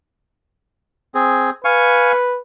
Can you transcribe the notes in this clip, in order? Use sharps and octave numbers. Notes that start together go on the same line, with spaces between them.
C4 G#4
B4 F5 G#5 C#6